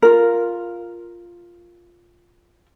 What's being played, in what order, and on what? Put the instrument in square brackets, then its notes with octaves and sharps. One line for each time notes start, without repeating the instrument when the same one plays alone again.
[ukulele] F4 A#4